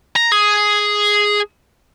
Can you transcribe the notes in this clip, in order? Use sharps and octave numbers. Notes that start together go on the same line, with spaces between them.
A#5
G#4